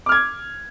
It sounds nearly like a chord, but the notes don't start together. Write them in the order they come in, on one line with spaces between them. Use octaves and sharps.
D6 F6 G#6